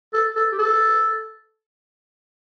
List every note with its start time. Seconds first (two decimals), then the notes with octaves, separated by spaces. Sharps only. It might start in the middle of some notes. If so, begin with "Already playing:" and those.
0.13 A4
0.36 A4
0.52 G4
0.58 A4